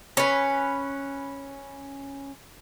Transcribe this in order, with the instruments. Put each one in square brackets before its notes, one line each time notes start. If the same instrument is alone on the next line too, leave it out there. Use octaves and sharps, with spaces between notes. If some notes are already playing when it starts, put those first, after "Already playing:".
[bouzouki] C#4 B4